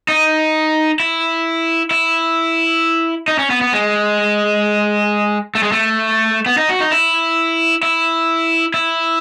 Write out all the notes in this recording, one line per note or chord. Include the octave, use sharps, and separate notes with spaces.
D#4
E4
E4
D#4
C#4
B3
B3
G#3
A3
G#3
A3
B3
D#4
F#4
D#4
E4
E4
E4